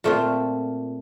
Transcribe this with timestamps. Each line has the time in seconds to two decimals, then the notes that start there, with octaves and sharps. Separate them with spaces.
0.04 A#2 A3 C4 F4